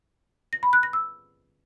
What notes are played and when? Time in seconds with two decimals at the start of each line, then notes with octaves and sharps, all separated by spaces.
0.53 A#6
0.63 B5
0.73 F#6
0.83 A#6
0.93 E6